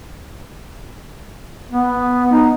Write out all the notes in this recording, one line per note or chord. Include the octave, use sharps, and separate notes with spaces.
B3
D#4